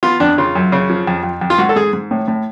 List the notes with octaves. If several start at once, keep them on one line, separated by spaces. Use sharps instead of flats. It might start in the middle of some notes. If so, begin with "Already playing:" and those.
B3 F4
F2 D4
C#3 F4
F#2
C#3
F3
F2
F2
F2
F4
G#2 F#4
A4
G#2 G#4
G#2
A2
A2